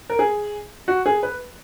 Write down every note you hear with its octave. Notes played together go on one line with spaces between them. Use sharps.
A#4
G#4
F#4
G#4
B4